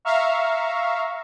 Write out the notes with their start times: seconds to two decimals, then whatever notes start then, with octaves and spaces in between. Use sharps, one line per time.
0.05 E5 F5 A#5 C#6